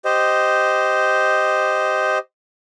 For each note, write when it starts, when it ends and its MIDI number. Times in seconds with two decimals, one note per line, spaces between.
0.05 2.19 67
0.05 2.19 72
0.05 2.19 75